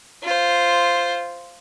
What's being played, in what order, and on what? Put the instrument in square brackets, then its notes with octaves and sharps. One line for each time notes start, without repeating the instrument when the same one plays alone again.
[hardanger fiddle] F4 C5